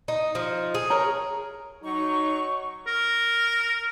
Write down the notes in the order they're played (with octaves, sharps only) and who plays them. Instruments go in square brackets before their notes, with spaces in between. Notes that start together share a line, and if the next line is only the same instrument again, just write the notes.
[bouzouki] D#4
F3 D#4
G#4
[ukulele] A#4 C#5 A#5
[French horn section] F#3 D#4 [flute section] C#6
[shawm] A#4